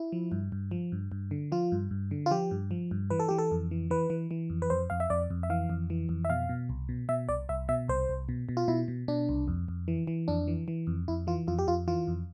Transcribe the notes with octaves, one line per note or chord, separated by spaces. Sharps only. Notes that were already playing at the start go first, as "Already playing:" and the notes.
Already playing: E4
F3
G2
G2
F3
G2
G2
D3
F3 F4
G2
G2
D3
F4
F3 G4
G2
F3
G2
E3 B4
A4
E3 G4
A4
F2
E3
E3 B4
E3
E3
F2
B4
F2 C5
F2 F5
E5
F2 D5
F2
E5
E3 F5
F2
E3
F2
E5
B2 F5
B2
C2
B2
B2 E5
C2 D5
C2 E5
B2 E5
C2 C5
C2
B2
B2
F4
B2 E4
B2
B2 D4
C2
F2
F2
E3
E3
F2 D4
E3
E3
F2
F2 E4
E3 F4
F2 F4
G4
F2 F4
E3 F4
F2